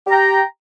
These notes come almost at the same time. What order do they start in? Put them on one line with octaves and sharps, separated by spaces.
G4 A#5 G5